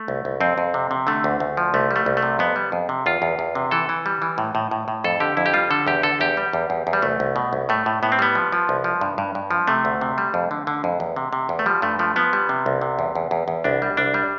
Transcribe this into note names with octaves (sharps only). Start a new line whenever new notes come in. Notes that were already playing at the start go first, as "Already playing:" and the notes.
Already playing: A3
C2
C2
F2 C4
F2
C3
C3
D3 A3
D2
D2
F3
C2 A3
G3
A3
C2
A3
C3
F2 B3
G3
F2
C3
E2 F4
E2
E2
C3
E3 A4
E3
G3
E3
A2
A2
A2
A2
F2 A4
D3 G4
F2 E4
G4
G3 F4
D3 A4
E2 G4
D3 A4
E2 G4
G3
E2
E2
E2
G3
C2 A3
C2
B2
C2
A2 A3
A2
A2 B3
C4
G3 B3
F3
F3
C2
F3
G2
G2
G2
F3
C3 A3
D2
C3
G3
F2
D3
D3
F2
E2
C3
C3
E2
A3
F3 G3
G2 A3
F3 A3
F3 B3
G3
C3
C2
C3
E2
E2
E2
E2
C2 D4
G3
C2 D4
G3